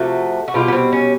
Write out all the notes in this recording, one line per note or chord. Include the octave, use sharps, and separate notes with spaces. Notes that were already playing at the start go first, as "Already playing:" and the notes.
Already playing: C3 F3 A3 F#4
F#4
B2 G3 F4
B3
C4
C#4